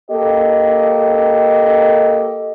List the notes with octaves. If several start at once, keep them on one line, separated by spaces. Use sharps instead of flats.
A#3 G4 A4 D#5